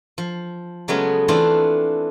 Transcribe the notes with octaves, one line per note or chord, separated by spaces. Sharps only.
F3
C#3 F#3 G#3 A3 B3 C#4
E3 A3 C4 D4 E4 F4